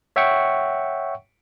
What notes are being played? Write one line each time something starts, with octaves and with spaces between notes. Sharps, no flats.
C#5 E5 F#5 G5 C#6